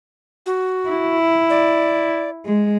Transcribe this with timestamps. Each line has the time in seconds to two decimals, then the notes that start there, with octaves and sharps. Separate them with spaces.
0.46 F#4
0.89 E4
1.50 D5
2.46 G#3